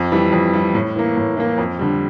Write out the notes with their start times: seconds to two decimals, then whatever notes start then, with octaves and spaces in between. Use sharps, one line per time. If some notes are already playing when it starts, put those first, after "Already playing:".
Already playing: F2
0.12 E3 G3
0.33 F2
0.53 E3 G3
0.75 A2
0.96 E3 A#3
1.17 A2
1.37 E3 A#3
1.58 F2
1.79 D3 G3